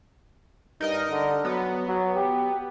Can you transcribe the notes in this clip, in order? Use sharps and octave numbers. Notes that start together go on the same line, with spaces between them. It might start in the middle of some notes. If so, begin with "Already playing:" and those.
G2 D#4 A#4 D#5
D3
F#3 B3
F#3
G4